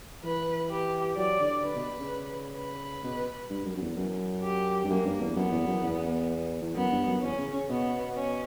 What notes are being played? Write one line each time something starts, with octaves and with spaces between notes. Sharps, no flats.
E3 B4
G4
F#3 D5
D3
D3 B4
B2
C#3
B4
B2
G2
F#2
F#2
E2
F#2
G4
G2
F#2 A#3
G2
E2
F#2 B3
E2
F#2
E2
E2
F#2 B3
G2
F#2
E2 C#4
C#3
C#3
B2 B3
C#4